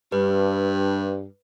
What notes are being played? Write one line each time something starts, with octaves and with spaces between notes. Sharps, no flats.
G2 B4